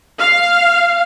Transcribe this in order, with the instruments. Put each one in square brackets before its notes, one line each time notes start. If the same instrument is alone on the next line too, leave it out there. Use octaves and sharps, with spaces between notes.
[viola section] F5